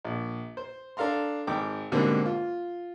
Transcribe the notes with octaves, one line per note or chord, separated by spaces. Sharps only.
A#1
C5
D4 A4 F5 A#5 C6
G#1 G5 D6
G#2 B2 D3 G3 A#3 C4
F4